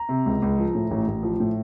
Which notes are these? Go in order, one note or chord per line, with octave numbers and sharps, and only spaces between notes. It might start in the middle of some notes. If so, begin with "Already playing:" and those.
Already playing: A#5
C3
C#2
C#2
F3
A2
A1
A1
F3
A2